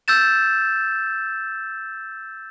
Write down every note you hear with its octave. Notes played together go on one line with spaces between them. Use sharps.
E6 G6 A6 E7